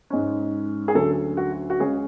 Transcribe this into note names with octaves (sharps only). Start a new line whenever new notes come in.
G#2 G#3 C#4
G#4
D2 D3 F#3 C#4 A4
F#4
F#4
C#2 C#3 G#3 C#4 G#4